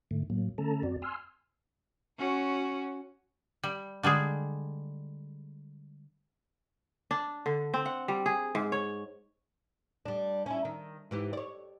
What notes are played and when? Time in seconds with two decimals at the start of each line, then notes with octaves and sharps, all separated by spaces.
0.11 G#2 D3 A3
0.30 A2 F#3 A#3
0.58 D3 A3 C#4 A4 A5 A#5
0.83 F#2 C4 F#4 D5
1.02 G#5 C6 E6 F6
2.19 C#4 F#4
3.63 G3
4.03 D3 G3 G#3 G#4
7.11 D4
7.46 D3
7.74 C4
7.86 F#5
8.08 G3
8.26 G#4
8.55 G#2
8.72 C#5
10.05 G3 D4
10.46 C#4 E4
10.65 D#3
11.11 G#2 E3 G4
11.33 C#5 D5